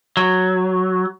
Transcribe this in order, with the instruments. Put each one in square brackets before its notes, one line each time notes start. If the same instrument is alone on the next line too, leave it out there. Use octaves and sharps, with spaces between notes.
[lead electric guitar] F#3